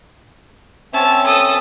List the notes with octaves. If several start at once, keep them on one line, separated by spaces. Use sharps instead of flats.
C4 C#4 C#5 E5 A5
A4 D#6